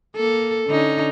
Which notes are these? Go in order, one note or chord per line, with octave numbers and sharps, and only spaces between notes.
A#3 A4
D3 C#4 D#4